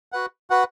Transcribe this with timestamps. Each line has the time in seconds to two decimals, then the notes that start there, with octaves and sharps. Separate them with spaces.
0.12 F#4 B4 F#5
0.50 F#4 B4 F#5